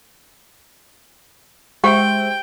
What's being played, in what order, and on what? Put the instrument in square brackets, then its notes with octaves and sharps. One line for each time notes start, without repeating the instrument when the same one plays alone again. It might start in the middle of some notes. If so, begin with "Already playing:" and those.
[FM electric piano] G#3 C5 E5 [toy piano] G4 F#5 [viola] G5